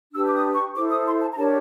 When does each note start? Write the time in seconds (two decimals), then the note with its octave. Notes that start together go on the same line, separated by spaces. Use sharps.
0.13 D4 G4 B4 E6
0.27 D6
0.34 D#6
0.54 C#6
0.75 E4 A4 C5 D6
0.90 D#6
1.06 C6
1.21 A5
1.32 A#5
1.37 D4 G4 A#4 C#5 A5